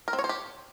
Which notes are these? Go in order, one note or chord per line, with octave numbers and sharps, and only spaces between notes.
A#4
C4
C#5
C5
G4